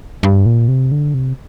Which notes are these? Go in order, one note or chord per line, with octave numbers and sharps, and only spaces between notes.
G2
A#2
C3
D3
C3